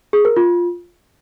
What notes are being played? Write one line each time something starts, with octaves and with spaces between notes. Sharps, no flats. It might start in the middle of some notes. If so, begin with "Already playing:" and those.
G#4
A#4
F4